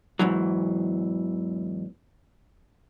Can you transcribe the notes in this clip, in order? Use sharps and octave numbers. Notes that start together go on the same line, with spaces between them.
E2 G#2 E3 F#3